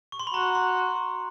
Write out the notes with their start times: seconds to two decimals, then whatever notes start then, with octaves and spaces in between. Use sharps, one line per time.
0.12 C#6
0.19 C6
0.27 B5
0.34 F#4 A#5
0.55 C6